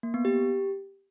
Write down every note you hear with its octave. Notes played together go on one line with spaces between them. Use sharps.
A#3
B3
G4